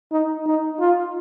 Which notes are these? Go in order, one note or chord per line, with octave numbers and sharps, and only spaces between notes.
D#4
D#4
F4